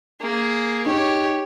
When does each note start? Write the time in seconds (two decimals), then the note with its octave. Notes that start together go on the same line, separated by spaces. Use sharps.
0.21 A#3 G#4
0.86 D#4 G4 C#5